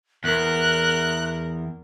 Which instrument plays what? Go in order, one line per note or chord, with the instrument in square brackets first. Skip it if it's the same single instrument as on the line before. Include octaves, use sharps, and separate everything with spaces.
[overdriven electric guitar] E2 [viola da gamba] A#4 [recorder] F#6